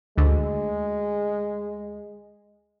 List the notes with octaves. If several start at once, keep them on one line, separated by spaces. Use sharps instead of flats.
D2 G#3